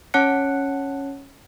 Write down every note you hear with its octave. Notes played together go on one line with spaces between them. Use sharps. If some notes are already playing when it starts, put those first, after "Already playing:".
C#4 C#5 F#5 A5 F#6 C#7